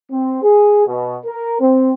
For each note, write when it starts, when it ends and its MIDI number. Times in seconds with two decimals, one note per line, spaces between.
0.11 0.42 60
0.43 0.85 68
0.87 1.17 47
1.25 1.59 70
1.60 1.92 60